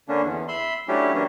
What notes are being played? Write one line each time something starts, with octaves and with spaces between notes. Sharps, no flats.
D3 A#3 C#4 D4
E2
E5 B5 C6
F#3 A3 C#4 D4 E4 G4
E3 A#3 C#4 D4